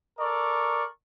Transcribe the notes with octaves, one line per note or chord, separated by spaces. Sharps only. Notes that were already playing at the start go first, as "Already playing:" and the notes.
A4 A#4 D5 C#6